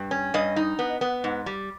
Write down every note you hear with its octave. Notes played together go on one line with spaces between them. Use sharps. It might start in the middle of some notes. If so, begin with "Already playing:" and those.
Already playing: G2
C#4
G2 D#5
D#4
B3
B3
G#2
G3